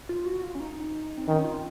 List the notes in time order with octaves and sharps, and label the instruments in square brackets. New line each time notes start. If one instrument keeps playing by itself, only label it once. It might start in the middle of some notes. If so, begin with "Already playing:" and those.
[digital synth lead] F4
F#4
F4
C#4
D#4
C4
[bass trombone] D#3 [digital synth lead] C#4
[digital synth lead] F4